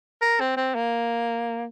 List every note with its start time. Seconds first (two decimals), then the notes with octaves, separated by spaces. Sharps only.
0.22 A#4
0.40 C4
0.57 C4
0.75 A#3